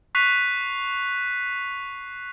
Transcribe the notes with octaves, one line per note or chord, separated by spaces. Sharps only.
C#6 F#6 B6 C7 D#7 F7